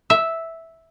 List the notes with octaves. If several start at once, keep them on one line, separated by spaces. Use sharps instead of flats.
E5